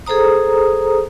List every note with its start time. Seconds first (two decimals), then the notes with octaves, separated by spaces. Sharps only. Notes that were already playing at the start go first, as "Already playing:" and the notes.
0.06 G#4 A4 C5 A#5 D#6